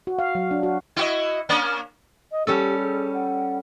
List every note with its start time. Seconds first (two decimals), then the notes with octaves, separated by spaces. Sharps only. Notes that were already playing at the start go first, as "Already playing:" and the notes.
0.07 F#4
0.19 F5
0.35 F#3
0.51 D4
0.63 F#4
0.96 E4 F#4 D#5
1.49 A#3 C#4 D4
2.32 D#5
2.47 G3 C#4 G4 A4
2.82 G#4
3.13 F#5